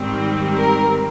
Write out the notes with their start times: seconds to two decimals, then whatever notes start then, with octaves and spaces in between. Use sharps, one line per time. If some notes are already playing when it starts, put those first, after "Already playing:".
Already playing: G#2 D#3 G3 C4
0.56 A#4